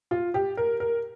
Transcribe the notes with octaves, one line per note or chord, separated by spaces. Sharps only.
F4
G4
A#4
A#4